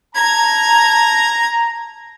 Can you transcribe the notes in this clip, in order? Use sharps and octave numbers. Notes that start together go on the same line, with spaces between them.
A5 A#5 G#6